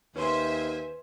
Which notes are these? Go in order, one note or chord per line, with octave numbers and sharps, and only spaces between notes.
D#2 C#4 B4 C5 E5 G#5 C6